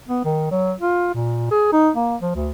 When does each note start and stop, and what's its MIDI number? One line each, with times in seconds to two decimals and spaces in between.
0.08 0.22 59
0.25 0.49 51
0.51 0.73 54
0.80 1.13 65
1.14 1.50 46
1.51 1.69 68
1.72 1.90 63
1.96 2.16 58
2.22 2.33 53
2.35 2.51 38